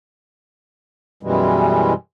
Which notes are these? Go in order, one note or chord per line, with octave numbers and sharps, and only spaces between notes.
F#2 B2 E3 G3 G#3